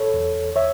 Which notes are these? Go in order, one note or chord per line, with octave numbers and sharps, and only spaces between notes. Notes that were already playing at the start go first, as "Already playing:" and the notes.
Already playing: A4 C#5
E2
C#5 E5